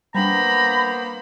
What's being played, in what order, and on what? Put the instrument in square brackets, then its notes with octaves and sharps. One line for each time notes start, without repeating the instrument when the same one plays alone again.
[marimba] G3 D4 [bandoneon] A#3 B3 C5 [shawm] A#5 [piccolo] B5